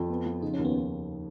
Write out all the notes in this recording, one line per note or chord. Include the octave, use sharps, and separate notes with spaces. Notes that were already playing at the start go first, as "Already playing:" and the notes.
Already playing: F2 F4
B3
F3
C#3 D#4
C#4
D#2
B3